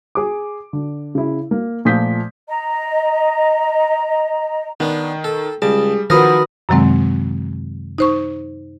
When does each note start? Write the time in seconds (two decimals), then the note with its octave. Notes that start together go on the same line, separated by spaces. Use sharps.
0.15 G#4 D6
0.73 D3
1.15 C#3 E4
1.51 A#3
1.85 A#2 F3 A3 D#6 G6 B6
2.48 D#5 A#5
4.80 D#3 B3 D4
5.24 A4
5.62 C#2 G3 G#4 A5
6.10 D#3 F3 F#4 A#4 B4 B5 D#6 A#6
6.69 F#2 C3 D#3 F#3 G#3 C4
7.98 D#4 C5 C#6